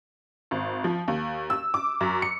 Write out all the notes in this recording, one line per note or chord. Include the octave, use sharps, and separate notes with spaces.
G#1
F3
D#2
E6
D6
F#2
C#7